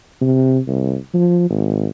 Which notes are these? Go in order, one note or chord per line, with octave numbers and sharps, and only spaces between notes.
C3
C2
F3
G#1